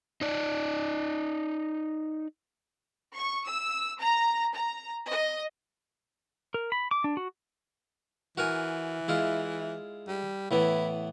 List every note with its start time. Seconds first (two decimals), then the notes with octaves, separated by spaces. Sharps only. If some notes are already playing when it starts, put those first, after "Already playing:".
0.21 D#4 D5
3.15 C#6
3.45 E6
3.99 A#5
4.53 A#5
5.06 D#5
6.54 A#4
6.72 B5
6.91 D6
7.04 D4
7.17 F#4
8.38 E3 F#4 A#4 G#5
9.08 G#3 E4 F4
10.08 G3
10.51 A2 E3 B3 E4